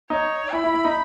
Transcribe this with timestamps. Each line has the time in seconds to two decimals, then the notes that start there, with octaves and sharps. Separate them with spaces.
0.10 D#4 C#5
0.53 E4 B5
0.64 E4
0.74 E4
0.85 D#4